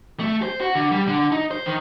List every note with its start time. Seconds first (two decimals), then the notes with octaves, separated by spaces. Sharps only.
0.20 A3
0.42 C5
0.60 F#4
0.75 D3
0.91 G3
1.07 D3
1.32 D#4
1.51 C5
1.66 D#3